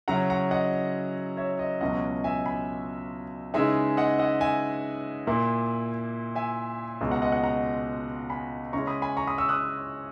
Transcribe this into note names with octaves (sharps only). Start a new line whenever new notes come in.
C#3 F#3 C#4 E4 F#5 A#5
F#5 A#5
D#5 F#5
C#5 E5
D#5
C#2 B2 F#3 C#4 E4 D#5 F#5
E5 G#5
G#5 B5
C#3 E3 G#3 D#4 E5 G#5
D#5 F#5
D#5 F#5
E5 G#5
A#2 A#3 E4
E5 G#5
C#2 B2 G#3
F#5 A#5
D#5 F#5
D#5 F#5
F#5 A#5
G#5 B5
C#3 G#3 C#4 E4 A#5 C#6
B5 D#6
G#5 B5
A#5 C#6
B5 D#6
C#6 E6
D#6 F#6